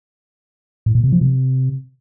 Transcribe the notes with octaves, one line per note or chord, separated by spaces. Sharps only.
A2
A#2
C3
F3
C3